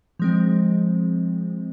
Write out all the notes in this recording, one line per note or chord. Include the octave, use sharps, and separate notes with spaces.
F3 G#3 C4